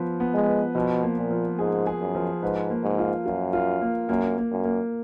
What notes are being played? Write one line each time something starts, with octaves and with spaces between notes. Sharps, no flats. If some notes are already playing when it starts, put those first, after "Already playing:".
Already playing: F3 B3 F4 B4
B3
G#3
B4
B2 F3
A#3
A#2
F3
G#2 G#4
G#4
F#2
F3
G#2 B4
A#3
G#2
F4
F#2 F4
F4
A#3
F#2 A#3
A#3
F#2
A#3